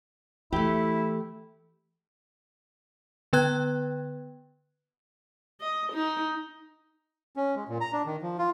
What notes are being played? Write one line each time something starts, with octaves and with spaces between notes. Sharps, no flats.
E3 A3 E4 G4
D3 B3 B4 G5 F#6 G#6
D#5
D#4
C#4
G#3
A#2
A#5
D4
D#3
F3
F4